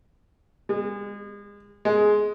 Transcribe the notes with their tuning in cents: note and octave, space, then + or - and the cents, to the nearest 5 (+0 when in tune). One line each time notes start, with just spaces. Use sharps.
G#3 -35
G#3 +10